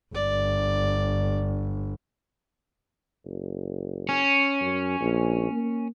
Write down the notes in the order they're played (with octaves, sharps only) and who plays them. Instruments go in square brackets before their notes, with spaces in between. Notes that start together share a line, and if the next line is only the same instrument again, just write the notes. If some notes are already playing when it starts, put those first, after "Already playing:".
[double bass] G1 [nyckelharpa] D5
[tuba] F#1
[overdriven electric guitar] C#4
[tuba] F#2
A#1
A#3